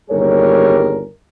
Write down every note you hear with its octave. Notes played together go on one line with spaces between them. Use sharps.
G1 D#2 G3 G#4 A#4 C#5